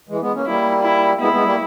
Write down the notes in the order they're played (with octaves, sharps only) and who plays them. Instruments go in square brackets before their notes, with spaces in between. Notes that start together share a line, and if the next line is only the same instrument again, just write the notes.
[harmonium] E3 G#3
G#3 B3
A#3 C#4
[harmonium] G3 A#3 [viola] E4
[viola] E4
[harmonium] G#3 B3 [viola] E4
[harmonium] G#3 B3
G3 A#3